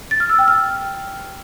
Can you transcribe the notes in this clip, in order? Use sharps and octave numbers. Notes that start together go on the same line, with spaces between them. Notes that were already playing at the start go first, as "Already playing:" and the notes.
A6
F6
E6
G5
F6